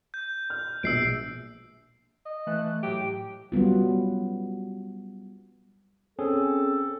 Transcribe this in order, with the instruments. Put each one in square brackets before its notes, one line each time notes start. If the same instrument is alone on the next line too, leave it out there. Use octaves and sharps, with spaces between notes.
[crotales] G6
[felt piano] F6
[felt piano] A#1 B2 [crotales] E6 C7 D7
[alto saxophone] D#5
[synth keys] E3 A3 F#6
[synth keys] A2 F#3 [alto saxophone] G4
[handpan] F#3 G3 B3 F4
[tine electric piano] C4 C#4 G#4 [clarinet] A4